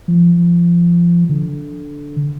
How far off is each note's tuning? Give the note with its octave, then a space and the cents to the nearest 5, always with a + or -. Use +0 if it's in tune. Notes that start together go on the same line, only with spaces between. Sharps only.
F3 -20
D3 -10